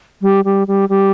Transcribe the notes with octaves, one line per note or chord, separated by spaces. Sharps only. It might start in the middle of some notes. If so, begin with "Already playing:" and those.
G3
G3
G3
G3